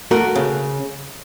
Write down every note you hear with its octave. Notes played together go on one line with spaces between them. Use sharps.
A3 F#4 A#4
C#3